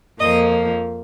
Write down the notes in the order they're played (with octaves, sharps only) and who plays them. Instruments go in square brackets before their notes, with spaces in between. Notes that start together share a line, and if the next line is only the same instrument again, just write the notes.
[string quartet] F2 F3 A#3 D#5